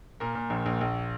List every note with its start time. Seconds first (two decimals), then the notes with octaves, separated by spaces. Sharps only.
0.20 A#2 A#4
0.35 A#2
0.50 A#1
0.66 A#1
0.81 A#1